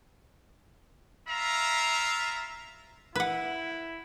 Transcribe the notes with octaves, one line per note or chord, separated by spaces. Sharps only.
E4 F4 E5 F5 A#5
E4 B4 F#5